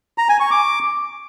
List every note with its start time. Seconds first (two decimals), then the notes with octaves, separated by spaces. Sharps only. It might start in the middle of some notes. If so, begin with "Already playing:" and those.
0.18 A#5
0.29 G#5
0.40 C#6
0.51 D6